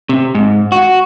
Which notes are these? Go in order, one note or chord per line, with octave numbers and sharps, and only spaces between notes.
C3
G#2
F#4